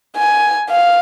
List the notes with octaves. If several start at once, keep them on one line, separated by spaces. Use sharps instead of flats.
G#5
F5